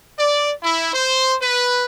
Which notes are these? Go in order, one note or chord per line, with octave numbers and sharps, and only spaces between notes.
D5
E4
C5
B4